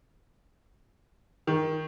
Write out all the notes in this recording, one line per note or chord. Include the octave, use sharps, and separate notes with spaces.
D#3